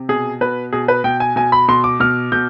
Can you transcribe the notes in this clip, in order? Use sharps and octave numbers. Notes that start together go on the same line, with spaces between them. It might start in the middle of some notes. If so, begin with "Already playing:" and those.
Already playing: C3
B2 G#4
B2 B4
B2 G#4
B4
B2 G5
G#5
B2 G#5
B5
B2 C6
D6
B2 F6
B2 G6